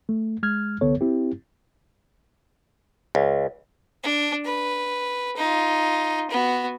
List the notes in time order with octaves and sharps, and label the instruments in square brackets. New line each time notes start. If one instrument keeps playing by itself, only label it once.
[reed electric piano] A3
G#3 F6 G#6
C2 D3 B3 A4 C#5
C4 E4 G4
[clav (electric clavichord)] C#2
[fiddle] D4
B4
D#4 F4
B3 F#4